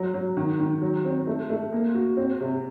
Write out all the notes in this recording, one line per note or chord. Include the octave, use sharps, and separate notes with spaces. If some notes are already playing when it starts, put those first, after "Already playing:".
Already playing: F#3
F#3
D#3
D#3
F#3
C4
A3
A3
A#3
F#4
C4
C3